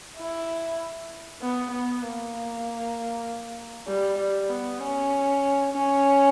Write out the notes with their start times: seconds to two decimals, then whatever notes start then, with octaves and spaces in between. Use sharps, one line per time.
0.18 E4
1.42 B3
1.71 B3
2.02 A#3
3.87 G3
4.19 G3
4.49 B3
4.79 C#4
5.73 C#4